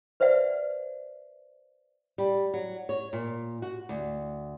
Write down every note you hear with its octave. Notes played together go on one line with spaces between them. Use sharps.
B4 C5 D5 E5 F#5
G3
F#3
C#5
A#2
F#4
D2